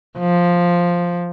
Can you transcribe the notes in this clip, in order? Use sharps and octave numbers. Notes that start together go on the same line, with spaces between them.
F3